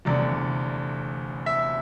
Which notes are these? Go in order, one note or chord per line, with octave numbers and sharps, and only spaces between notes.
F1 E2 D3 D5
E5